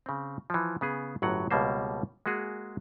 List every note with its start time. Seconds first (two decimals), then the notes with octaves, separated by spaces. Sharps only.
0.06 C#3 C4
0.50 E3 F3
0.81 C#3 B3 G#4
1.22 G1 A2 F#3 F#5
1.51 C#2 B2 G3 A#3 C5
2.26 G#3 A#3 F#4 G#4